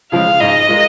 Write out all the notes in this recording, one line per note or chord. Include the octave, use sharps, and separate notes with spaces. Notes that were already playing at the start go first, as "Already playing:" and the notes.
C#3 F3 G#3 F5
G#2 D#5
G#3 F4 A#4